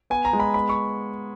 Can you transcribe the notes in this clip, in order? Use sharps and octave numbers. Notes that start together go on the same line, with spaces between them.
B3 G#5
A#5
G#3
B5
B3 B5
C#6